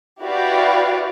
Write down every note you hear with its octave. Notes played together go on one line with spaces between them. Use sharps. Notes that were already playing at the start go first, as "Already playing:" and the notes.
E4 F#4 G4 B4 D5 F5